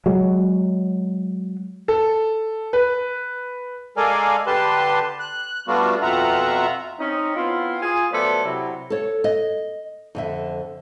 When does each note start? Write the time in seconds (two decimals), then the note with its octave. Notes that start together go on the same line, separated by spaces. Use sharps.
0.06 F#3 G#3
1.88 A4
2.73 B4
3.97 G#3 A4 A#4 D5 F5 G#5
4.47 D3 G4 B4 A5 C6
5.20 F#6
5.68 G3 A3 B3 D4 F4 F#4
6.02 F2 B2 F4 E5 F#5 A#5
6.99 C4 C#4 D#4
7.36 B3 C4 E4 F4
7.82 F4 G#4
8.12 F#3 A3 B3 A4 C5 D5
8.45 C3 F#3 E4
8.90 A4 C#5
9.24 D#5
10.15 F2 D3 E5